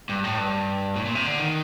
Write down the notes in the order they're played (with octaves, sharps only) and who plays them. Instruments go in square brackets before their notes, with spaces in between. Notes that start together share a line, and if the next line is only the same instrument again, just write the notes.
[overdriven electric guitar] G2
A2
G2
A2
A#2
C3
D3
D#3